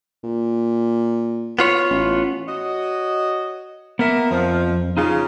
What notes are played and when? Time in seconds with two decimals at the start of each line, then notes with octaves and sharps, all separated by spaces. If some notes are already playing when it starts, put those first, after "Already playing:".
0.23 A#2
1.59 B3 F4 C#5
1.90 A1
2.48 F#4 C#5 D#5
3.99 A#3 B3 A#4 E5
4.31 F2 F3
4.97 C#3 D#4 F4 G#4